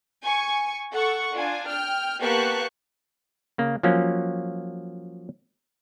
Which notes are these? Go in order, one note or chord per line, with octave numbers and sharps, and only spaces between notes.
G#5 C#6
A4 F#5 C#6
D4 F4 G#5
G5 F6
A#3 B3 G4 A5 C#6 F#6
C#3 A#3
F3 F#3 A#3 C#4